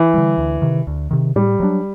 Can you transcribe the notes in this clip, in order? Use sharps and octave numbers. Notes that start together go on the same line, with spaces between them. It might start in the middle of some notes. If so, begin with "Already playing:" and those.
Already playing: E3
D3 G3
D2
C3 D#3
D2
C3 D#3
A2 G3
F#3 A3 D4